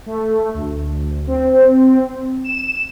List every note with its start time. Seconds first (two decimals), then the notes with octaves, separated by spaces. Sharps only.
0.06 A3
0.54 D2
1.27 C4
2.44 E7